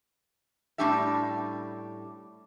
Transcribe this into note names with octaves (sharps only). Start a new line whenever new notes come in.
A2 G3 C#4 D4 G4 E5